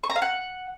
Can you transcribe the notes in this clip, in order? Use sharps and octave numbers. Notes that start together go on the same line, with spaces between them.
C#6
A#5
F5
F#5